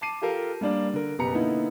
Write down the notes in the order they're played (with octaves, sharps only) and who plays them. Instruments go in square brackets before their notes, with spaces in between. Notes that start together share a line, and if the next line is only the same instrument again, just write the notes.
[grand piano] A5 D6 C7 D#7
F4 G4 A4 A#4 F5
G3 A#3 D4 D5
D3 A#4
F#1 B2 G4 B4 A#5 C#7
D3 A#3 B3 D#4 E4